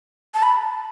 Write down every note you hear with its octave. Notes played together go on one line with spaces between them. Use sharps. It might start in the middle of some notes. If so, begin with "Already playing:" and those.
A5
B5